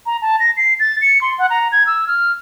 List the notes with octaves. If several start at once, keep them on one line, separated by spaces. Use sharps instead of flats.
A#5
A5
A#6
C7
A6
C#7
C6
F#5
A#5
G#6
E6
F6